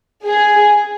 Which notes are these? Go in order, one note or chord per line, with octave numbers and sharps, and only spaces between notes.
G#4